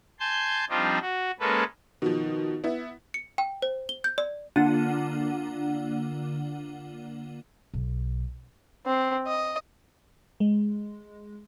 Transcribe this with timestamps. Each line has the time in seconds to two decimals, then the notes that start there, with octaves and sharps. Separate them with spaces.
0.20 G#5 A5 C6 G6
0.70 F3 G3 C4 D4 D#4 F4
1.02 F#4
1.40 G#3 A#3 C#4 A4 B4
2.02 B2 D#3 F3
2.64 B3 E4
3.14 C#7
3.38 G5
3.62 C5
3.89 G7
4.04 G6
4.18 D5
4.56 D3 A#3 D4 F4 F#5 D#7
7.74 B1
8.86 C4
9.27 D#5
10.40 G#3